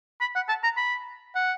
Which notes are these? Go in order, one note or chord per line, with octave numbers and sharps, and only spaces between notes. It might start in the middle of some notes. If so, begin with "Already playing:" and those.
B5
F#5
A5
A#5
B5
F#5